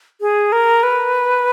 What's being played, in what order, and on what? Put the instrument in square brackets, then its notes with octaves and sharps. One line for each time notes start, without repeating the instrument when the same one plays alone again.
[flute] G#4
A#4
B4